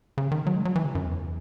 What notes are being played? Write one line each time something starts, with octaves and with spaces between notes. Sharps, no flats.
C#3
D#3
F#3
G#3
F#3
E3
C#3
F#2
E2